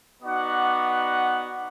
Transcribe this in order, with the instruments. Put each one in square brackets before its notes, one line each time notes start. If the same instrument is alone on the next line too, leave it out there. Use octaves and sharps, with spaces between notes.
[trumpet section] B3 D#4 F#4 D5 F#5